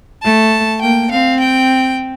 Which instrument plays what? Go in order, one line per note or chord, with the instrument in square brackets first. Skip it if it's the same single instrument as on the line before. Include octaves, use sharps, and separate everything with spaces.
[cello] A3 [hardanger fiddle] A5
[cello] A#3 [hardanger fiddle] G5
[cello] C4 [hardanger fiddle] F5
[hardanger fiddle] G5